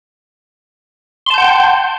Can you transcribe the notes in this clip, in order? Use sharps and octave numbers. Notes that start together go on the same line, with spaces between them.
F#5 G5 A5 C6 G6